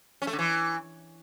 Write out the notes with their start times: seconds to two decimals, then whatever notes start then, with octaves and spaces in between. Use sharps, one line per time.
0.22 C#4
0.27 A3
0.33 D3
0.39 E3